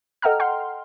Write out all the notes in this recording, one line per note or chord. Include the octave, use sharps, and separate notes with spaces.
A4 D#5 F#5 G5 A#5 F6
F#5 G5 C6